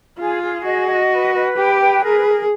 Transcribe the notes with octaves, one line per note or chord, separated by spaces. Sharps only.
F4 G#4
G#4
F#4 D#5
D#5
B4
B4
G4 G5
B4
G#4 A#4
A#4